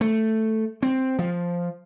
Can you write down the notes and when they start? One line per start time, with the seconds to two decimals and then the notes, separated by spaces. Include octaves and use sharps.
0.01 A3
0.83 C4
1.19 F3